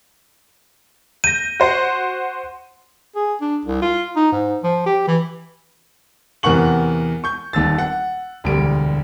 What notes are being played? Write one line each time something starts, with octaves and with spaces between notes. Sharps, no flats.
G6 A#6 D#7
F#4 C5 F#5
G#4
D4
C2
F4
D#4
G#2
F3
G4
E3
E2 C3 A#4 F#5 C#6 F#7
C#6 G6
D#1 D#2 E6 A6
F#5
E1 D2 G3 D7